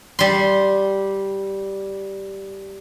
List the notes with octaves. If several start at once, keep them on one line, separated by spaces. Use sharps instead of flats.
G3 C6